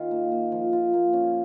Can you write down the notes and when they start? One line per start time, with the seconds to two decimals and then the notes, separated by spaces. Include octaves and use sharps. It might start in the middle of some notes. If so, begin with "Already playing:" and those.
Already playing: D#3 F4
0.11 A#3
0.32 A#3
0.52 F3
0.73 F4
0.93 A#3
1.13 C#4